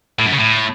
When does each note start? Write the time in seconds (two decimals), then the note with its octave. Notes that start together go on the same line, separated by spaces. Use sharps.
0.19 A2
0.26 F#2
0.32 C#3
0.39 A2